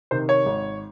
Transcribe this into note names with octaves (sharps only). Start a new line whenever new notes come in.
C3 D#3 C5
C#5
G#1